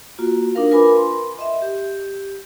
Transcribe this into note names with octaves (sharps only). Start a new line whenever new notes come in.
A#3 F4 F#4
D4 D#4 A#4 F5
F4 A#4 B4 G#5 B5 D6
C6
D#5 E5
G4